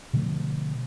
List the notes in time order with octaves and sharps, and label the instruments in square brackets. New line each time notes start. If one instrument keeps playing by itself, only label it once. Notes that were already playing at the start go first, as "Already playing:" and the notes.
[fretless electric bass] B2 D3 F3 A3